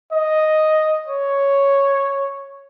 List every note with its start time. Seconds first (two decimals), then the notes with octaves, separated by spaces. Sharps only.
0.13 D#5
1.08 C#5